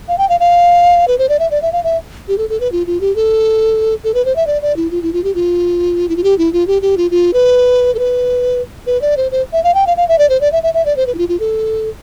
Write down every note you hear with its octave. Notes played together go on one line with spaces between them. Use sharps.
F5
G5
F5
F5
B4
C5
D5
E5
D5
E5
F5
E5
G4
A4
A4
B4
F4
F4
G4
A4
A4
B4
C5
E5
D5
D5
E4
F4
E4
F4
G4
F4
E4
F4
G4
E4
F4
G4
G4
F4
F4
B4
A4
B4
B4
D5
C5
C5
E5
F5
G5
F5
F5
E5
D5
C5
D5
E5
E5
E5
D5
C5
B4
E4
F4
F4
A4